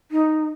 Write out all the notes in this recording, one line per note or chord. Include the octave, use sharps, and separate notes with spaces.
D#4